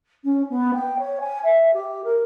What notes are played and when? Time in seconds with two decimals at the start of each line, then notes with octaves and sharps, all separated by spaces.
0.24 C#4
0.50 B3
0.74 G5
0.99 C#5
1.20 G#5
1.44 E5
1.74 G4
2.04 A#4